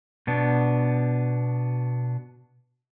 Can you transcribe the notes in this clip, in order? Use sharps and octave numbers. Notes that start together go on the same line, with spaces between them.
B2 B3 D4